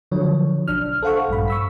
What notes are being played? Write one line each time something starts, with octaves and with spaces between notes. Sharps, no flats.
D3 F3 F#3 C#5
B1 D4 F6
A4 C5 F5 F#5 C#6
A#1 G2 B5
C#6 E6 B6